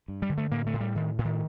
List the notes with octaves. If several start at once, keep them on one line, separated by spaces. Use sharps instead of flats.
G2
G3
D3
A3
A2 A#3
A3
A2
G3
A2 D#3
A2
D#3